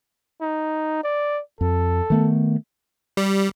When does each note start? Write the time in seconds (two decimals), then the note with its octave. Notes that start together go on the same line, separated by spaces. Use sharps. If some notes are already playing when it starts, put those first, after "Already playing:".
0.41 D#4
1.03 D5
1.61 F2 A4
2.10 D#3 A3 B3
3.17 G3